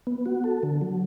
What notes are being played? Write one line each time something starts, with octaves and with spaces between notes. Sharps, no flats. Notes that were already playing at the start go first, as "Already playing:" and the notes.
B3
F#4
A4
D3
F#3